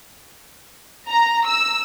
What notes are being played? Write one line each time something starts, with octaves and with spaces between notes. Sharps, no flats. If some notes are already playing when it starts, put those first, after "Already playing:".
A#5
E6